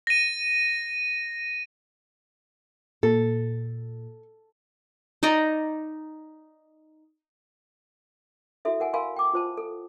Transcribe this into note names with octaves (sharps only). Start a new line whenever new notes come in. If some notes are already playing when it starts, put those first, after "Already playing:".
A#6 D#7
A#2 A4
D#4 D5 D#5 A#5
E4 F#4 A4 E5
A#4 F#5 G#5
A#4 F5 G#5 B5 C6
G5 D6
F4 C5 A5
A4